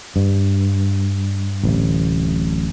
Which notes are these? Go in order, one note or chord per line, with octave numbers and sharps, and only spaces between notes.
G2
D1 A1